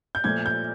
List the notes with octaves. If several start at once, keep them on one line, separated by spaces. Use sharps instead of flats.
G6
A#2 F3 A3 G#6
G6